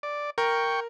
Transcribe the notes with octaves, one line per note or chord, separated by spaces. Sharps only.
D5
A#4 G5 C#6